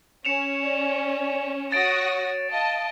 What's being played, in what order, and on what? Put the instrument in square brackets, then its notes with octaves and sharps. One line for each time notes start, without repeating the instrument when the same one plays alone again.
[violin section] C#4 [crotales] C#7 E7 F7
[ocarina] D5
[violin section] F#4 D#6 A#6 [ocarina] C#5 [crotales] A6 D7
[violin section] D#5 A5 [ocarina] F5